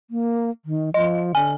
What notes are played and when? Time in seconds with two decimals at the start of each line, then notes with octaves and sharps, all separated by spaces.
0.11 A#3
0.65 D#3
0.94 F3 D#5
1.35 D3 G#5